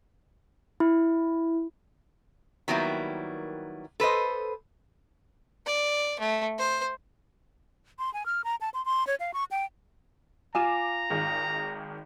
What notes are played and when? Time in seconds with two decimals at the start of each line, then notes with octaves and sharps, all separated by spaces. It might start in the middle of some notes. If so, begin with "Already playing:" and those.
0.80 E4
2.68 D#3 F#3 G3 A#3 B3 E4
4.00 A4 B4 C5 D#5
5.66 D5
6.20 A3
6.58 C5
7.99 C6
8.14 G#5
8.26 F6
8.44 A#5
8.61 A5
8.74 C6
8.85 C6
9.07 C#5
9.20 F5
9.34 C#6
9.51 G5
10.55 F4 F5 G#5 A#5 D6 E7
11.10 G#1 D#3 G#4